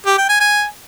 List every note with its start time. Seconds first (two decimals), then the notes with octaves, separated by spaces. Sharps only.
0.06 G4
0.18 G5
0.29 G#5
0.41 G#5